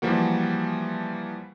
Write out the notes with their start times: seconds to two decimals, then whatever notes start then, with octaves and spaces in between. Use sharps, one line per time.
0.02 E3 F3 G3 A#3 F#4